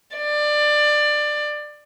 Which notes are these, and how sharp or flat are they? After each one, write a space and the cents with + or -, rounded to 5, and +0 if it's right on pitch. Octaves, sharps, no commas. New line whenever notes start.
D5 +20